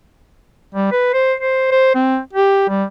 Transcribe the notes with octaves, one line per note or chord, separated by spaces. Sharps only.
G3
B4
C5
C5
C5
C4
G4
G3